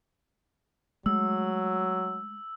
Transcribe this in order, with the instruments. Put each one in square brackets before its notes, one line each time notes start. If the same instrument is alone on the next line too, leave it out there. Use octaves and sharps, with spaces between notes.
[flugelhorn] F#3 [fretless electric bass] G#3 A3 [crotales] E6